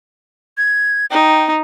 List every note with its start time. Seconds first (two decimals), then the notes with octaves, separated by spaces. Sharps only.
0.58 G#6
1.10 D#4 G5